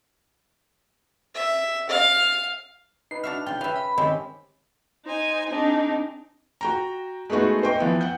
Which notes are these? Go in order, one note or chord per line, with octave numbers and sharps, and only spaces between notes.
E5
F5
D#4 B4 C7
D4 F#4 E5 F6
C#3 F4 G5
C#4 B4 E5 F5
B5
D#3 G#3 C4 C#4 G4
D#4 C5 G#5
C4 D4 D#4 G#4
F#4 G5 A#5
G#3 A3 B3 D#4 F#4 G#4
C5 D#5 G5 C6 C#6
E3 F3 B3 E4
F#5 G5 G6